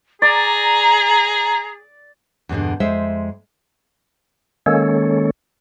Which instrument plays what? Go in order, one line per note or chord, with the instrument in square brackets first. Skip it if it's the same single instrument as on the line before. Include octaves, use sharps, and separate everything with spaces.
[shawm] G#4 [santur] D5 [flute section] A#5
[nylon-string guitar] E2 G2 B2 D3
F2 G#3 C5 E5
[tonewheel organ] D#3 G#3 A#3 C#4 A4 C#5